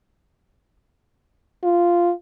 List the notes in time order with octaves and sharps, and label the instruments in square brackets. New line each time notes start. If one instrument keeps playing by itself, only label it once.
[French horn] F4